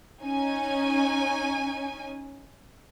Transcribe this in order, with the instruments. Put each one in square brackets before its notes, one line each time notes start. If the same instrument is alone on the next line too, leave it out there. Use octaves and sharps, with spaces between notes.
[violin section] C#4 D#4 G#5